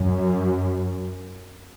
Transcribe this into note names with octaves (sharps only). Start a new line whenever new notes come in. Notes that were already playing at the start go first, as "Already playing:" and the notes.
Already playing: F#2